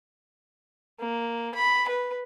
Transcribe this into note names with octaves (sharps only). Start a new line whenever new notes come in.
A#3
B5
B4